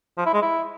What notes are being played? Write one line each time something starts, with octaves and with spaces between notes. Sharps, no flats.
F3
E4
G#3
E4